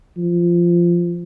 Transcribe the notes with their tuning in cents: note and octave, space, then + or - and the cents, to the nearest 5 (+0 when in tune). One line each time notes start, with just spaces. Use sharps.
F3 -10